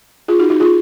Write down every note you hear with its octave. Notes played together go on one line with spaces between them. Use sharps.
F4 G#4
D#4 F#4
D#4 F#4
F4 G#4